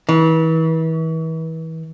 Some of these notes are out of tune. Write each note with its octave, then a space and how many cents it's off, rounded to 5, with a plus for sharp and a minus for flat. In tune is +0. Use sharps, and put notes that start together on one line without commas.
E3 -35